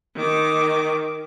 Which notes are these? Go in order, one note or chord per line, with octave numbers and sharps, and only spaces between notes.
D#3 D6